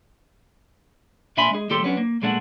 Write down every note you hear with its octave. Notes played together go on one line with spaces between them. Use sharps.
A#2 D4 E5 G#5 B5 C6
G#3 G#4
D#2 A2 G3 G4 A4 C6
F#3 B3 C#4 D4
A#3
B1 A#2 G#3 A3 D4 F#5